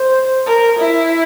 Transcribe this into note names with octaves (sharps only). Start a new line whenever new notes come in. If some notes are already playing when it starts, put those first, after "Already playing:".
Already playing: C5
A#4
E4